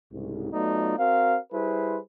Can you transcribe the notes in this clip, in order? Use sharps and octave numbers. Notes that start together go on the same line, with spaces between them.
C2 G#2 C#3
F#3 A3 B3 D#4 F4 D5
C4 F#4 A#4 F5
G3 E4 G#4 B4 C5